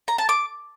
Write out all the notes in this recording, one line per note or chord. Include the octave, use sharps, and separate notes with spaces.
A#5
A5
D6